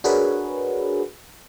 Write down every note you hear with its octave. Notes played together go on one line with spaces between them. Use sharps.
D4 F#4 G#4 A#4 B4 C#5